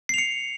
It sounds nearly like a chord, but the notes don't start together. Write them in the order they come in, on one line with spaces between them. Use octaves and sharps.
C7 F7 C#7